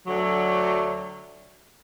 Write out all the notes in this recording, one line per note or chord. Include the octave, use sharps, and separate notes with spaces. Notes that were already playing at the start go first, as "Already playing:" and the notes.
D2 D3 F#3